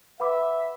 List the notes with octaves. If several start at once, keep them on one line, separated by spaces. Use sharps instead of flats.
B4 E5 F#5 B5 D6